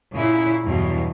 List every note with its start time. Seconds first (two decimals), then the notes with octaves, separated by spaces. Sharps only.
0.14 A#2 C#3 E4
0.63 E2 G2 B2 F#3